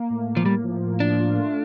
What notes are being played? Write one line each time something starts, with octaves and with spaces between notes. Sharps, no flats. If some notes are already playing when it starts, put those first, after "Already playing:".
Already playing: A#3
A2
A#3
F3
G3 A#3
F3
A#3
F3 D4
F4
A3